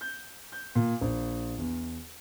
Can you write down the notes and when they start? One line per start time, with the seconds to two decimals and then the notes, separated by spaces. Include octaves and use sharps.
0.01 G6
0.52 G6
0.75 A#2
1.01 A#1
1.58 E2